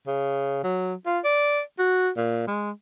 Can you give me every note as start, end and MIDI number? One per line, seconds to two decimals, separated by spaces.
0.07 0.59 49
0.64 0.94 54
1.07 1.19 65
1.25 1.61 74
1.79 2.10 66
2.17 2.45 46
2.47 2.71 56